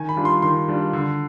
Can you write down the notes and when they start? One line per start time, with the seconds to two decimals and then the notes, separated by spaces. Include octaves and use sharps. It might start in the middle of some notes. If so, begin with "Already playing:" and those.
Already playing: D#3 G#5
0.09 B5
0.17 G3 D4 F4
0.25 C6
0.42 D#3 C6
0.68 G3 D4 F4
0.93 D3